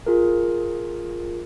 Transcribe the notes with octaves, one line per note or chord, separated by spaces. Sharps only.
F4 G#4 A#4